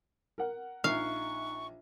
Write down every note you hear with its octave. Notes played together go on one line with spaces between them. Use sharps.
A#4 F#5
A#1 D#4 E5 F5 C#6 F#6